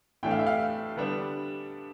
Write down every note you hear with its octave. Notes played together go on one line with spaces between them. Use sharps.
A2 E3 A3 D4 G5
F5
E5
F5
D3 G3 B3 D4